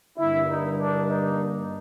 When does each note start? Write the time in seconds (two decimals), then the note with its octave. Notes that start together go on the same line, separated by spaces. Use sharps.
0.17 G2 D3 G3 A#3 E4
0.47 D#4
0.78 D4
1.09 D#4